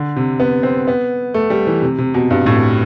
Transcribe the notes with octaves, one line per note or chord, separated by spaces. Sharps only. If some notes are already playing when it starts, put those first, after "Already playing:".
Already playing: D3
C3
B3
C4
B3
A3
G3
E3
C3
C3
B2
G2
A2